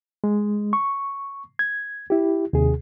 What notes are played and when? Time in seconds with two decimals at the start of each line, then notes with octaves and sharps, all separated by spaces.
0.24 G#3
0.73 C#6
1.59 G#6
2.10 E4 G4
2.53 D#2 C3 G#4